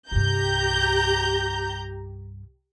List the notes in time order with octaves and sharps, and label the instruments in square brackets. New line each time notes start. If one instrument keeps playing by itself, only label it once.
[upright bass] C2 G2 [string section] G4 A#5 G6